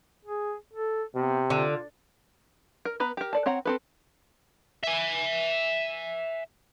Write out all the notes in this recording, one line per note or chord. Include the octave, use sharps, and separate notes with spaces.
G#4
A4
C3 B3
D3 F4
A#4
B3 B4 A#5
G4 A#4
A4 D5 A5
C4 C#5 F#5 A#5
C4 A4 B4
E5 G#5